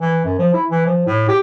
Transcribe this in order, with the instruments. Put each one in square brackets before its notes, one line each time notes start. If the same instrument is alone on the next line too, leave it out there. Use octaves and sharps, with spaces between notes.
[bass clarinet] E3
F#2
F3
E4
E3
F3
A2
G4